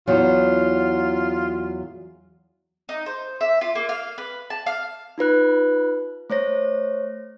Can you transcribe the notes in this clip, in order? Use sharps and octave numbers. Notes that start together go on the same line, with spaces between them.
E2 F#3 F4
D#4
C5
E5
F4
A#3
F5
B4
A5
F5
D#4 F4 B4 F#6
A3 C5 C#5 A#6